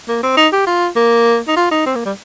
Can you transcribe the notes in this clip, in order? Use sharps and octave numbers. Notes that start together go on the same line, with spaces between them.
A#3
C4
D#4
G4
F4
A#3
D#4
F4
D#4
C4
A#3
G3